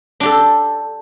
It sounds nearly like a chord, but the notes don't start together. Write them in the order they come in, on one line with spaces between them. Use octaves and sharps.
D4 G4 A4